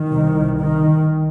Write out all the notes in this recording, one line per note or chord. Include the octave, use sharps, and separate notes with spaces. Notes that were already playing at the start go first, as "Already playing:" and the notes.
Already playing: D#3
C2 C3
D#3